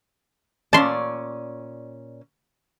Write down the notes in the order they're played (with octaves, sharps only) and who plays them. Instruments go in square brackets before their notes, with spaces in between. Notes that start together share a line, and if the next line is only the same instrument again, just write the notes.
[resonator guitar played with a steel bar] A#2 C#4 D5 [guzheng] A5 C6